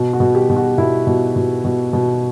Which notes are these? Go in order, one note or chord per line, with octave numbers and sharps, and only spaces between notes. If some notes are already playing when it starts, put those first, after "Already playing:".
Already playing: B2
F#4
B2
G4
B2
F#4
B2 E4
B2
B2
B2
B2